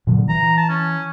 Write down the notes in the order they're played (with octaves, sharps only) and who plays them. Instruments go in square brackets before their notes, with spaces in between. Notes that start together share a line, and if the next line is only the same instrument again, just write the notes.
[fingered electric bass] A#2 D3 F#3
[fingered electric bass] E3 [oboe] A#5
[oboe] A5
C#4